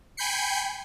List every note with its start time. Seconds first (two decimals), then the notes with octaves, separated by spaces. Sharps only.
0.17 G5 G#5 B5 G6 C7 C#7